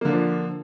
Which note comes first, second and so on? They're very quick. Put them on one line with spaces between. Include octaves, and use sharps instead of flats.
A#3 D3 D4 F3